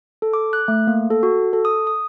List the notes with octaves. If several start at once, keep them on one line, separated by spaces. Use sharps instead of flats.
A4
D6
F#6
A3
A#3
A4
F#4
A4
D#6
D#6